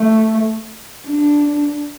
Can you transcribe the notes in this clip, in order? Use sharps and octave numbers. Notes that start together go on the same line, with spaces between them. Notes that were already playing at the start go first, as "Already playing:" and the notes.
Already playing: A3
D4